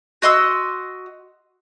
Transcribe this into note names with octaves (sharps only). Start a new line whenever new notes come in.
F#4 D#5 C6 E6